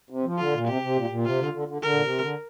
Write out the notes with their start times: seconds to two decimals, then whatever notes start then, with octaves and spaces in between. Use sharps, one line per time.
0.10 C3
0.25 F3
0.38 D3 F4
0.53 A#2
0.67 C3 G4
0.82 C3
0.96 A#2
1.10 A#2
1.25 C3 F4
1.39 D3
1.53 D3
1.68 D3
1.82 D3 A#4
1.93 A#2
2.01 C3
2.20 D3